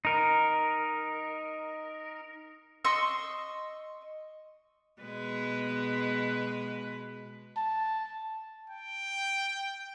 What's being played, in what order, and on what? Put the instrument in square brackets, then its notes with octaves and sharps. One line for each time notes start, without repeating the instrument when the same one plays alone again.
[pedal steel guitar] D#4 A#4
[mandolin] D#5 C6 C#6 E6
[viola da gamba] B2 G#3 B4
[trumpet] A5
[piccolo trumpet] G5